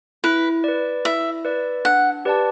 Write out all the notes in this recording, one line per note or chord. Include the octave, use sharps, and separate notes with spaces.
E4 B4
B4 D5
E4 E5
B4 D5
D4 F#5
G4 B4 D5 A5